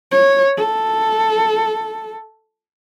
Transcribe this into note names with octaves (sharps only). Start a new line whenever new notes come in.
C#5
A4